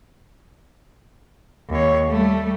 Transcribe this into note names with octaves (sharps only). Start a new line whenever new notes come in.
D#2 C#5
G3 A3